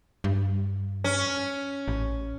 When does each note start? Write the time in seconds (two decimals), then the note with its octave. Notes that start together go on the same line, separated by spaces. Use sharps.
0.24 G2
1.04 C#4
1.88 A1